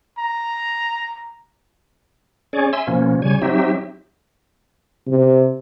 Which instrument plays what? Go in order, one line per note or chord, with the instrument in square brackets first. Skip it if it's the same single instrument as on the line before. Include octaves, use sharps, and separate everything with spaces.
[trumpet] A#5
[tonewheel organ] C#4 G#4 C#5 D5
E5 G#5 C6 E6
B2 F3 A#3 C#4
C#3 G3 C#5 G#5
F#3 C4 D#4 G4 E5
[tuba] C3